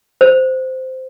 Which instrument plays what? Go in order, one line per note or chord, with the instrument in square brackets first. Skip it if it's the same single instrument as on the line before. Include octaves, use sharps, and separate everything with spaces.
[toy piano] C5